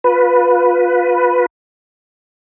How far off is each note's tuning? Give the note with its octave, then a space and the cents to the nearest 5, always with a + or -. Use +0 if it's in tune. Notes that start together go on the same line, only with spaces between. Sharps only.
F4 +25 B4 +0